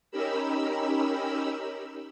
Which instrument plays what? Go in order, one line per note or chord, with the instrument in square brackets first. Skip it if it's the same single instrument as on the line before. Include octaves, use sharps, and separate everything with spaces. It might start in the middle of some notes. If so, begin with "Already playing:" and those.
[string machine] C#4 D#4 G4 A#4 B5 E6